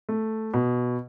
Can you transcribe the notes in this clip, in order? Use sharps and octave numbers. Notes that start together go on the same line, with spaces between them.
A3
B2